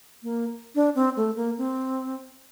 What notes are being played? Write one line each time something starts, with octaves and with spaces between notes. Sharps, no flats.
A#3
D4
C4
A3
A#3
C4